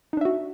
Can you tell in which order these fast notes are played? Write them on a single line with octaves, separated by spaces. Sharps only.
D#4 D4 E5 F#4